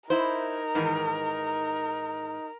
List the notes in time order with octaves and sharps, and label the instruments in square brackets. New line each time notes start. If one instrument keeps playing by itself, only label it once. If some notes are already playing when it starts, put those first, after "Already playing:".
[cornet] D#4 [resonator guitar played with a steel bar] E4 C5 [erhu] A#4
[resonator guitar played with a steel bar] G#2 D#3 E3